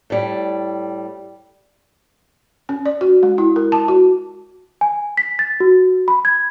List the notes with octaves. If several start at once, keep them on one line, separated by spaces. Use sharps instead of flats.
A2 G3
C#4
D5
F#4
G#3
E4
A#4
A5
F#4
G#5
B6
A6
F#4
B5
G#6